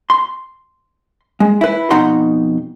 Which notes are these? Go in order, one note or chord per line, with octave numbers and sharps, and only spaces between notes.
C6
G#3
E4 B4
F2 B2 D#4 F#5 A#5 C6